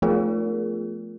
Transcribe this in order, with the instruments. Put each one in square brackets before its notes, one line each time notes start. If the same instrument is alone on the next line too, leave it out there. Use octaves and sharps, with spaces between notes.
[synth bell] F3 A3 B3 F4 G#4 A#4